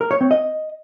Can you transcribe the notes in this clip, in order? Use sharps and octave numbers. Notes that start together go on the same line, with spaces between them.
A#4
C#5
C4
D#5